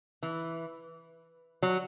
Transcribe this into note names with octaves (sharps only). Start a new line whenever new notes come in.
E3
F#3